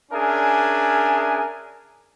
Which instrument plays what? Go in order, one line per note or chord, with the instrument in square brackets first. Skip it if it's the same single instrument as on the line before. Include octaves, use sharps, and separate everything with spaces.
[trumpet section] C#4 D4 G#4 A#4 E5 G#5